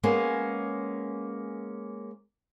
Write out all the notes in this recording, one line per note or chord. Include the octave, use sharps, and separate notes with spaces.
G#3 A#3 B3 C#4